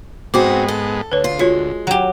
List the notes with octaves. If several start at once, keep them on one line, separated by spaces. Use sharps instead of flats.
G#2 G#3 B3 C4 F#4 D6
A4
D2 B4 C#5
F4
G#3 F4 F#4 C#5
F#3 G4